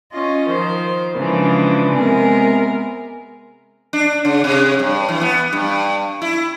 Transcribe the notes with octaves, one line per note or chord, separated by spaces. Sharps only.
C#4 F4 D#5
D#3 F3 C5
C#3 E3 F3 G#3 D4
C3 G#3 B3 G#4 A#4
D4
C#3
C3
G2
E3
B3
G2
E4